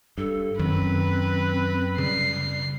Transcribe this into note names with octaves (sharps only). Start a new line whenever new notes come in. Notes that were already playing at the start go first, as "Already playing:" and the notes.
G2 A4
F#2 D#3 C4 B4
C#3 G3 C7